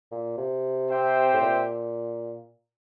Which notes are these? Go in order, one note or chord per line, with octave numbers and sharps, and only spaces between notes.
A#2
C3
C4 G4 C5 E5 G5
A2
A#2